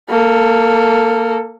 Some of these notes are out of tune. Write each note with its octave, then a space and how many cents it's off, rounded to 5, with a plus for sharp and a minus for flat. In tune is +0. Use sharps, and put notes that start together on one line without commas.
A#3 -10 A4 +10